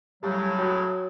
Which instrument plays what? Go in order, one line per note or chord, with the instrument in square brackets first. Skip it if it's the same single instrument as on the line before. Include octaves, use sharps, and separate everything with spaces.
[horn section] A2 C#3 [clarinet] F#3 [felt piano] G3
[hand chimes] F#4 C#5 G6 [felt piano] G5 D#6 F#6